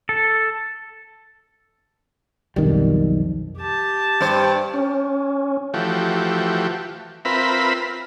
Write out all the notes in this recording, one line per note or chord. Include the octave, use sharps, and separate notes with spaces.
A4
B1 F2 D#3 G3
G4 A5
G2 C5
C#4
E3 F3 A3 F#4 G4
C4 F4 A#4 B4 E5 B5